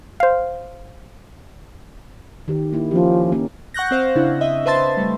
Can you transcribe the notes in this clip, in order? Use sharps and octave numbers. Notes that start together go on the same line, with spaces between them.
C5 F5
D#3 G4
A#3 E4
F3 C#4 G4
A#3 C#4 A#4
F#5 C#6 F#6 G6 A#6
C4 C5 F5
C#3 D4 E4
D#5 E5
B4 C5 E5 A5 C6 A6
G3 A3